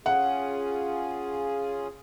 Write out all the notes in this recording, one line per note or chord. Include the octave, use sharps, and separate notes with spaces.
C#4 F4 G#4 F#5